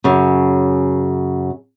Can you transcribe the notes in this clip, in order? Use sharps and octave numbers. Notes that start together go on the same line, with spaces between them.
F#2 C#3